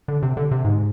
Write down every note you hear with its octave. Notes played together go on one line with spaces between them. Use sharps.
D3
C3
D3
C3
G#2